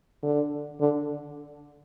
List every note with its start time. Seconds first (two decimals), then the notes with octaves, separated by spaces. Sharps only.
0.23 D3
0.81 D3